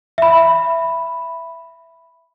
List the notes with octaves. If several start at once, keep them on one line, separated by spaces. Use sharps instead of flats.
E5 B5